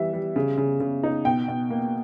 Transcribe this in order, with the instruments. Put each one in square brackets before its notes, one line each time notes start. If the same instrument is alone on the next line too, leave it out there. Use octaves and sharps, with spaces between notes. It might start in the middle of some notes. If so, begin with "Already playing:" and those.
Already playing: [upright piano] E3 G3 E5
G3
C#3
C#3
C#3
D#4
B2 G5
B2
A#3